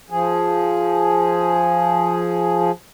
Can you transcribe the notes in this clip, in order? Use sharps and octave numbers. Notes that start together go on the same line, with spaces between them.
F3 G#4